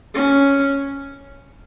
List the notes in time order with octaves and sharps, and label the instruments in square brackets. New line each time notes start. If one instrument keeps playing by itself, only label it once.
[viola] C#4